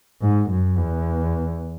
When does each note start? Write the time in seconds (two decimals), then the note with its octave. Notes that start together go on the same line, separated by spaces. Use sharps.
0.21 G#2
0.50 F#2
0.78 E2